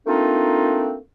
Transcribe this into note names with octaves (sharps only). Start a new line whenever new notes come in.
A3 A#3 C4 D4 D#4 F4